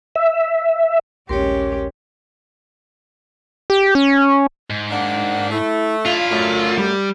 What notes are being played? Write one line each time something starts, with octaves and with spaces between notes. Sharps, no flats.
E5
A#1 D#2 G#3 C#4 G4 A#4 C#5 C6
G4
C#4
G#2
D#3 A#3 D4 F#5
A3 E4
D4 E4 F4 F5
F#2 A3
G3